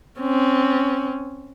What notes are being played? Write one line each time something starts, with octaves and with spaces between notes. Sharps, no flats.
C4 C#4